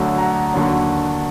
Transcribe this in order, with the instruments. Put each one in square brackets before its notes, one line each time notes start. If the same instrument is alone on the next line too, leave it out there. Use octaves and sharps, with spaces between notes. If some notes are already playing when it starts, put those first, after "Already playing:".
Already playing: [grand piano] D2 D3 F#3
F#5 A#5
D#2 D3 F#3